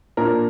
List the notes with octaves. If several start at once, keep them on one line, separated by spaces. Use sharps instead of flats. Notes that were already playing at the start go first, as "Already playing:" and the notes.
A#2 A#3 D4 A#4